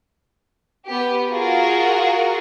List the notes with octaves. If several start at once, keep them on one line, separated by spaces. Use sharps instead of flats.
B3 G4
F4 F#4 G#4 A#4